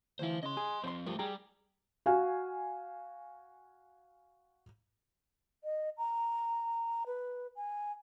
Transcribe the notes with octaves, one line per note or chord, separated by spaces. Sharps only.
D2 E3 E4 C5 F5
C#3 D#5 C6
G#4
F3 C4 C5 C6
G2 F3 A3 A#4
G3 G#4 G5 A#5
F#4 F5 G#5
D#5
A#5
B4
G#5